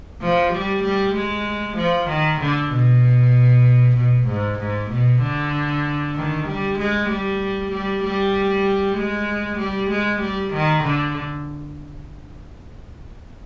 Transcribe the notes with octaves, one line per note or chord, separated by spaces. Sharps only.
F3
G3
G3
G#3
F3
D#3
D3
B2
B2
G#2
G#2
B2
D3
D#3
G3
G#3
G3
G3
G3
G#3
G3
G#3
G3
D#3
D3